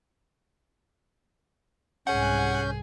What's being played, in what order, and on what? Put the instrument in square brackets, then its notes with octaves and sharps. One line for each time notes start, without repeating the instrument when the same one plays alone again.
[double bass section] C2 G#2 [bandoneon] C#4 G6 [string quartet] G#4 [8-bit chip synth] F#5